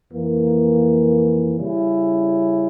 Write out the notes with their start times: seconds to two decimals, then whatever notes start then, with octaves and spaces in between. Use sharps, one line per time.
0.12 F2 E3 A#3
1.57 C#3 G3 C#4 E4